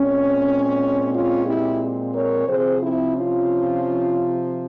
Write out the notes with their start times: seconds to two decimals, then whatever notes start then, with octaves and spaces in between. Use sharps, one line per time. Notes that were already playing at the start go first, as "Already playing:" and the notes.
Already playing: A#2 G#3 C4 C#4
1.12 C#4 F4
1.46 E4 G4
2.13 A#4 C#5
2.47 C3 F3 C4 G#4 C5
2.81 C4 E4
3.15 C#4 F4